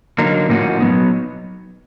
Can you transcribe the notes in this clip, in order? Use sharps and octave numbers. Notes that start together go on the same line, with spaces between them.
D3 F#3 A#3 D#4
A2 F3 A#3 C#4 F#4
F#3 B3 D#4